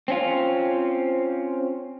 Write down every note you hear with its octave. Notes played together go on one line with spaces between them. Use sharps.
C4 C#4 F4